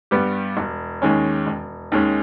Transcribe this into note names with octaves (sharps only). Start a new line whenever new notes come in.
G2 G3 B3 G4
E1
D#2 D#3 G#3 C#4
E1
D#2 D#3 G#3 C#4